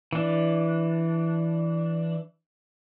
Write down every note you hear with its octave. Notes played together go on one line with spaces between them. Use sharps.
E3 D4